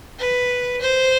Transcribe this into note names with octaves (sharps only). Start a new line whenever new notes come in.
B4
C5